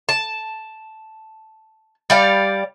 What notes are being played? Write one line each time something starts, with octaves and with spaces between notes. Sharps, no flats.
A5
G3 D5 F5